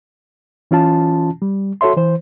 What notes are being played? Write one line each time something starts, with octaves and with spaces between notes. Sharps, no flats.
E3 C#4 F4 A5
G3
F#4 A4 C#5 E5 C6
E3 C5